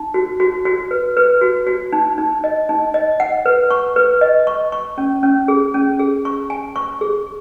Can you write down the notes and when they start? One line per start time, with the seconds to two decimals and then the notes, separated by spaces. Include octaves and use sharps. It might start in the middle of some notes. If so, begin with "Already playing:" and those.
Already playing: D#4
0.14 F#4
0.40 F#4
0.65 F#4
0.91 B4
1.17 B4
1.41 F#4
1.67 F#4
1.93 D#4
2.18 D#4
2.44 D#5
2.69 D#4
2.94 D#5
3.20 F#5
3.46 B4
3.71 C#6
3.96 B4
4.21 D#5
4.47 C#6
4.72 C#6
4.98 C#4
5.23 C#4
5.48 G#4
5.74 C#4
5.99 G#4
6.25 C#6
6.50 G#5
6.76 C#6
7.01 G#4